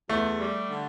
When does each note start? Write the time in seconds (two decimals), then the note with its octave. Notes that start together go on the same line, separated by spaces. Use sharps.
0.09 E2 A3
0.40 G3
0.70 D3